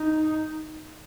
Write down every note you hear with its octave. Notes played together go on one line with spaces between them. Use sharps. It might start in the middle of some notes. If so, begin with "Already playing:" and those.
Already playing: D#4